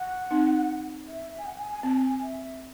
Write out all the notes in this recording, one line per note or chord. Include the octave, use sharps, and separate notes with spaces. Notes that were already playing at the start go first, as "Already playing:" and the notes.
Already playing: F#5
C4 D#4
E5
G#5
F#5
G#5
G#5
C4 A5
G#5
G#5
E5